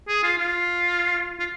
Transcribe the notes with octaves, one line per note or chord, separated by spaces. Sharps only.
G#4
F4
F4
F4